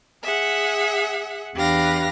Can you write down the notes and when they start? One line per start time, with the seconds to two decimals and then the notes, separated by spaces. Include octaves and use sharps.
0.23 G#4 E5 F#5
1.56 E2 D4 G4 B4 F5 A#6